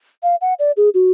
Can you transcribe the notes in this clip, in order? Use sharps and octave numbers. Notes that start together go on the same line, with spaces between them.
F5
F#5
D5
G#4
F#4